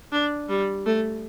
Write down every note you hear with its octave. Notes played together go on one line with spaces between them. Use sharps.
D4
G3
A3